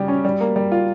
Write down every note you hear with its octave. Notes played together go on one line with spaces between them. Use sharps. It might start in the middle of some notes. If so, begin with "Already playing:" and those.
Already playing: C#3 G3 G4
C#4
G3
A#3
G3
F4